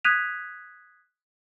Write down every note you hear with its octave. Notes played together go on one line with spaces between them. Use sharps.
D#6 F#6 G#6 B6 D#7 F7